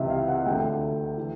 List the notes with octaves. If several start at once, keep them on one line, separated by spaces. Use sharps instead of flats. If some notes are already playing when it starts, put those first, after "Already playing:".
Already playing: C#2 C3 E3 D#5 E5
F5
F#5
D2 D3 G5
E3